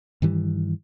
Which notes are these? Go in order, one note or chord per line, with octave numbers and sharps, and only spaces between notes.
G2 D#3 E3 G3